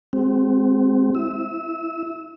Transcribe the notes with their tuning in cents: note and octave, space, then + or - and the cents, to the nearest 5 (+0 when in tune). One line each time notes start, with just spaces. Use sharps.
G#3 +0 C4 +0 F#4 +45
E4 +0 E6 -25